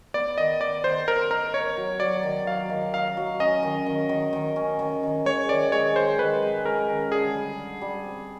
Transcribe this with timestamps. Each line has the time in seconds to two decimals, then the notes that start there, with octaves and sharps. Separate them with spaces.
0.14 B3 D5
0.38 D#3 D#5
0.61 D#4 D5
0.84 D#3 C5
1.07 D#4 A#4
1.31 D#4 A#4
1.54 D#4 C#5
1.77 F#3
2.00 F#3 D5
2.23 D#3
2.47 F#3 F5
2.70 D#3
2.94 D#4 F5
3.17 F#3
3.40 C#4 D#5
3.63 D#3
3.86 D#3
4.09 D#3
4.33 D#3
4.56 C#4
4.79 D#3
5.03 D#3
5.25 G#3 C#5
5.49 D#3 D5
5.72 G#3 C#5
5.96 D#3 C5
6.19 D#3 B4
6.42 G#3
6.65 C#4 A#4
6.89 D#3
7.12 D3 G#4
7.35 G3
7.58 D3
7.81 G3
8.05 C4